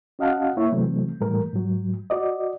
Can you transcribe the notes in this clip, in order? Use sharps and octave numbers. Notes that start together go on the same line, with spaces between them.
C#4 F#4 D#5 F5 F#5 A5
A#3 E4 C#5 E5
C3 E3 F#3 A3 C4
A2 E3 G3 A3 A#4
G#2 F#3
F#4 D5 D#5